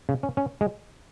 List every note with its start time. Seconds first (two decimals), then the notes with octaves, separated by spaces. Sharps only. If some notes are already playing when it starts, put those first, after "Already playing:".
0.09 C#3
0.23 C#4
0.37 C#4
0.61 G#3